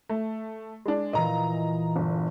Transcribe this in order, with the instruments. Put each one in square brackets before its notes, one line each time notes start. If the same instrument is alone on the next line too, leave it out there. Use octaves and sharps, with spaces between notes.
[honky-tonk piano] A3
G#3 D4
[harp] A#2 E3 [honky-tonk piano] D#5 A#5
[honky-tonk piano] G1